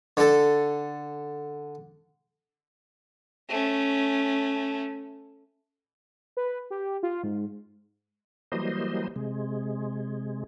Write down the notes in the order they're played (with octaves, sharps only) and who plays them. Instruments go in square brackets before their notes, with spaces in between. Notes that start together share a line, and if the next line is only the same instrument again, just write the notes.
[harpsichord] D3 A4
[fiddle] A3 C#4
[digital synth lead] B4
G4
F4
G#2
[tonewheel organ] E3 F#3 G3 A#3 C5 D#5
C3 G#3